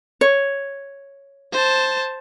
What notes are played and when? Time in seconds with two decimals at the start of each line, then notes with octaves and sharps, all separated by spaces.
0.21 C#5
1.52 C5 A5